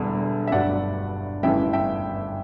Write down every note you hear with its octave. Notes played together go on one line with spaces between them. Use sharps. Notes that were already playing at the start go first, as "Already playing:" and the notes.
Already playing: E1 E2 D3 G3
E5
G1 G2 F#3 D5 F#5
G1 F#2 C#3 E3 E5 G5
E5 G5